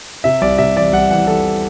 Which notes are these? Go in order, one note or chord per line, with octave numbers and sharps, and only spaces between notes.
C3 E5
C2 D5
C3 E5
E3 D5
C2 F#5
E3 F#5
E3 A4